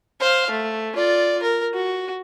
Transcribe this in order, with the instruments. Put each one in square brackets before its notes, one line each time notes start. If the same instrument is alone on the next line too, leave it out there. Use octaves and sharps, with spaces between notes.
[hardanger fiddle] C5 F5
A3
F4 D5
A#4
F#4